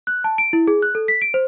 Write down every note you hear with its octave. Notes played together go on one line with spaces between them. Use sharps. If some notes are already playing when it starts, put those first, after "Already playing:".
F#6
A5
D7
E4
G#4
F#6
A4
B6
D7
C5